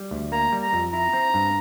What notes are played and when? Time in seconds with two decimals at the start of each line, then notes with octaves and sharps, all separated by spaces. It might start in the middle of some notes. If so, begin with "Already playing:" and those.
Already playing: G3
0.11 D2
0.32 A#3 A#5
0.52 G3
0.62 A#5
0.73 F2
0.93 E4 A#5
1.13 C4
1.34 G2